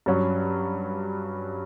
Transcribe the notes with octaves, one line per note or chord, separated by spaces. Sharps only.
G2 F#3 C#4